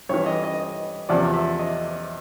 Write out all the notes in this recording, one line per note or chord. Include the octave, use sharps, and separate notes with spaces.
G2 E3 C#5
D#5
D#5
D#5
E2 C3 F3 D5
E5
D#5